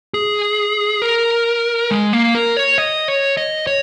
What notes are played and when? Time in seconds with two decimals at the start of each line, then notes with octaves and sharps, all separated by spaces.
0.14 G#4
1.02 A#4
1.91 G#3
2.13 A#3
2.35 A#4
2.57 C#5
2.78 D#5
3.08 C#5
3.37 D#5
3.67 C#5